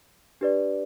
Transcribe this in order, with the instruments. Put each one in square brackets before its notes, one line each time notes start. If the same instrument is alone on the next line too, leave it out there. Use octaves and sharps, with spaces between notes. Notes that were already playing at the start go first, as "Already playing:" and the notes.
[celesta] D4 G4 B4 D5